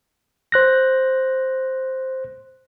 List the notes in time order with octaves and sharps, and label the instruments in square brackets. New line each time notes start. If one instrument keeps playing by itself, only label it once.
[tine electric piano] C5 F#6 A#6